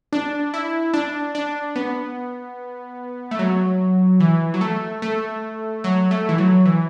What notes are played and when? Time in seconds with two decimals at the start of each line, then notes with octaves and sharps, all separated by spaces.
0.13 D4
0.54 E4
0.94 D4
1.35 D4
1.76 B3
3.31 A3
3.39 F#3
4.20 E3
4.54 F#3
4.61 A3
5.02 A3
5.84 F#3
6.11 A3
6.29 E3
6.38 F#3
6.66 E3